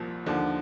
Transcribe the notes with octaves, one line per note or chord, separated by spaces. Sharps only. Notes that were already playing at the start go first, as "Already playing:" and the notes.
Already playing: C2 A#2 F3 A#3
D#2 D3 F3